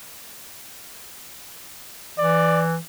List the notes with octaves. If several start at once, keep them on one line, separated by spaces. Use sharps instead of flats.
E3 D5